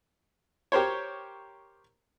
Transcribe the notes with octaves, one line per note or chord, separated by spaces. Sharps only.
G4 A#4 C5 C#5